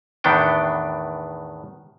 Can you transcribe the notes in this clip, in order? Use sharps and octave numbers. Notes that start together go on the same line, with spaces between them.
E2 A2 D#3 B3 D4 G5